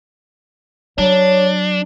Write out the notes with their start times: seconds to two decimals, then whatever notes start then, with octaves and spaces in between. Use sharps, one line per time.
0.98 F#3 D4 C#5